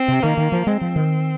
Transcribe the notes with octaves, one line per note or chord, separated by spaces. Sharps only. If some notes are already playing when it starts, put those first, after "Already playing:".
Already playing: C4
C3
D#3 A#3
D#3
F3
G#3 C4
F3
D#3